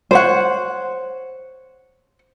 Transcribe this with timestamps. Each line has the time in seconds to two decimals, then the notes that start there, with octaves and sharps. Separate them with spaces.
0.11 C5 C#5 F#5